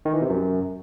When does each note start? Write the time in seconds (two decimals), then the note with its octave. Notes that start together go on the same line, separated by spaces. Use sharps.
0.05 D#3
0.14 E3
0.22 C3
0.30 F#2